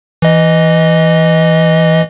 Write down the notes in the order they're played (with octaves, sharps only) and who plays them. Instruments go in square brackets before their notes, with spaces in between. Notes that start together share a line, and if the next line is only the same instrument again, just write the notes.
[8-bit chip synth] E3 D#5